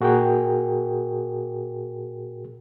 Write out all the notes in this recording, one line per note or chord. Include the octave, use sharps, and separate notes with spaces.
A#2 F#4 G#4 A#4 G5